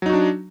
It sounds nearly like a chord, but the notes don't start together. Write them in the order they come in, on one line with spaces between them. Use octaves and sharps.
F#3 D#4 F#4 D4